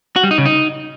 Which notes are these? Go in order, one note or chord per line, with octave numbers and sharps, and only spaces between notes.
F#4
G3
D#4
C#3
D#4